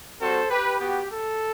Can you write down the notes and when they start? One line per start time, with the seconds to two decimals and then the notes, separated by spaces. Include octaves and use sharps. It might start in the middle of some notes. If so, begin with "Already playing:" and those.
0.20 G3 C4 F#4 A4 C5
0.50 G4 B4
0.80 B3 F#4 G4
1.09 A4